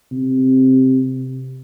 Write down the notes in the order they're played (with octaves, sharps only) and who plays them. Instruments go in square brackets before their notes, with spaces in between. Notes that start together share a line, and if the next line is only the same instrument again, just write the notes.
[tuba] C3